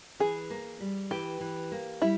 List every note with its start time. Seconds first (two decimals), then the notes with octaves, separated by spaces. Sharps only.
0.20 E3 G#4
0.50 A#3
0.80 G3
1.11 E3 G4
1.41 E3
1.72 A#3
2.02 G3 E4